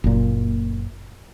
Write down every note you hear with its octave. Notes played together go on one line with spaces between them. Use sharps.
F#1 A#2